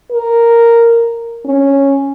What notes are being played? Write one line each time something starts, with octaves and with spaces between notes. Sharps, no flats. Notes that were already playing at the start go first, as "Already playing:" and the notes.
A#4
C#4